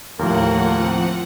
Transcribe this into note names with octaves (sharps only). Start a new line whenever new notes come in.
D#2 A2 F3 A#3 A#4 F#5
C4